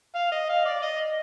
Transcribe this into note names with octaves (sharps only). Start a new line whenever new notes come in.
F5
D#5
F5
D5
D#5